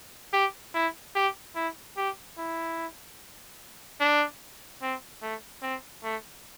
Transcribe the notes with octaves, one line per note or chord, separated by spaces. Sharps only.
G4
E4
G4
E4
G4
E4
D4
C4
A3
C4
A3